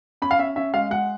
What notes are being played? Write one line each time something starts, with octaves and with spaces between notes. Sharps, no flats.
C#4 B5
F5
C#4 E5
C#4 E5
G#3 F5
G#3 F#5